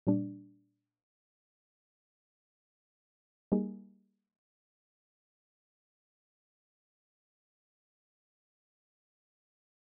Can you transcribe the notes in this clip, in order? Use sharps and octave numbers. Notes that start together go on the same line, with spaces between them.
A#2 G3 D4
G3 A#3 D#4 G#4